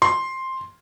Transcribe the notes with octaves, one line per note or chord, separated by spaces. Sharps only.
C6